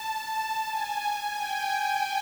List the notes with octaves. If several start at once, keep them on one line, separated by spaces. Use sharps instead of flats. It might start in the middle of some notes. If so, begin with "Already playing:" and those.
Already playing: A5
G#5
G5